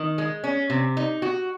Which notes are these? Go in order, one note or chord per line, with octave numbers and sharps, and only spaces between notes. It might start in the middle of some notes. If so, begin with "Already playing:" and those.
Already playing: D#3
G#3
C#4
C3
D#4
F#4